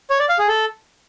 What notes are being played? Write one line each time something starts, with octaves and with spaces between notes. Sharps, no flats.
C#5
D5
F5
G#4
A4